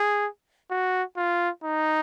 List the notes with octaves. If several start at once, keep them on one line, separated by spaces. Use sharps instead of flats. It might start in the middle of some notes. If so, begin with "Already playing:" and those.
Already playing: G#4
F#4
F4
D#4